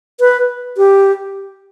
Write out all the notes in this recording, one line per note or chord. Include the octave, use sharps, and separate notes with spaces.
B4
G4